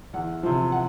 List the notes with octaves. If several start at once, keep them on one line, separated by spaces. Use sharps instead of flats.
E2 F#5
C3 F3
F#5